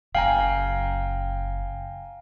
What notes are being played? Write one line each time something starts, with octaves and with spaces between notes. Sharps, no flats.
F#1 C#3 F5 G5 G#5 A#5